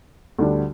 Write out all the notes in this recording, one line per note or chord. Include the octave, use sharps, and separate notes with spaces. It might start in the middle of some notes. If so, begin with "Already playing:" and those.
D2 D3 G3 D4